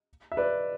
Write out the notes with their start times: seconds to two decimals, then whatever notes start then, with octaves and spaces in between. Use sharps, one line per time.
0.32 E5
0.37 B4 D5